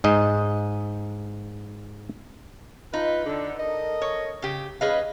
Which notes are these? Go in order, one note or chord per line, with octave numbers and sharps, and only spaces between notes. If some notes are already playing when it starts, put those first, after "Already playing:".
G#2 D#5
D#4 F4 B4
D3
A4 A#4 D#5
C#5
C#3 G4
G#2 C#4 G#4 B4 D#5 F5